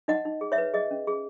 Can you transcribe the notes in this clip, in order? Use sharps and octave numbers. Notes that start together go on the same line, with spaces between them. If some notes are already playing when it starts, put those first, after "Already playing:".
D#4 D#5 F#5
D#4
G#4
C#5 E5
B4
G#4 D#5
C#4
G#4